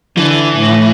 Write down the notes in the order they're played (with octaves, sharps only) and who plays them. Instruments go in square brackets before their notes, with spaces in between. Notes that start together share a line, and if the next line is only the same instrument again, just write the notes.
[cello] D3 [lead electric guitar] E3
[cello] A2